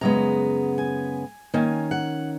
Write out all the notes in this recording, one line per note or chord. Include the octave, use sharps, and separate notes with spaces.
F#2 C#3 G#3 B3 A#5
G#5
D#3 A#3 C#4 G#5
F#5